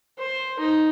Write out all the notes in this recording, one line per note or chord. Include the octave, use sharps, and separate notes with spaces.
C5
D#4